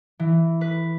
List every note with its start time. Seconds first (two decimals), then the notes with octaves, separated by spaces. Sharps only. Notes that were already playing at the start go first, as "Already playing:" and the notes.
0.20 E3
0.61 B4